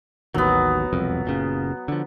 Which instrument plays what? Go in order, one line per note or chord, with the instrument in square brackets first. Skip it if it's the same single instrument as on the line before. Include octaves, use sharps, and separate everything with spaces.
[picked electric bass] A1 D#2 D#3 [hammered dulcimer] F#3 B3
[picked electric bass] E1 C2 F2
F#1 A#2 C#3
D3 F3